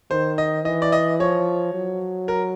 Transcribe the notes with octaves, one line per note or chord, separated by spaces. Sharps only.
D#3 C5
D#5
E3 D#5
D5
D#5
F3 C#5
F#3
A#4